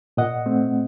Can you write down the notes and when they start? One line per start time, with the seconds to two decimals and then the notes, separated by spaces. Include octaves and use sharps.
0.17 A#2 D#5 F#5
0.46 A3 C4